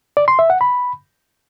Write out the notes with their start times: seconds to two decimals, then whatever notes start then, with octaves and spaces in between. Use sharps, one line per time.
0.17 D5
0.28 C6
0.39 E5
0.50 F#5
0.61 B5